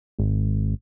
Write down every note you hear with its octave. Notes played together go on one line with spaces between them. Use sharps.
G#1